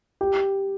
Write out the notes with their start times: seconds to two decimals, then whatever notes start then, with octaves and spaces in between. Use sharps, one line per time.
0.21 G4